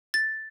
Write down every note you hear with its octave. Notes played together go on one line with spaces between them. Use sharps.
A6